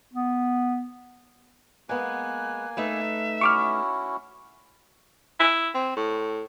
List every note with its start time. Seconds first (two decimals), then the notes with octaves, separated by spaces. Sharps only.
0.13 B3
1.89 G#3 A#3 B3 G#5 F#6
2.77 A3 D#4 B4 E5
3.41 C#4 E4 F#4 C#6 D6 F6
5.40 E4
5.74 C4
5.96 A2